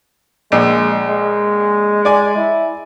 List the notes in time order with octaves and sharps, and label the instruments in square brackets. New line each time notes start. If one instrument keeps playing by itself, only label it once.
[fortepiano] A#1 [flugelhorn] G#3
[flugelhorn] G#3
[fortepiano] D5 G#5
[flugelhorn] E4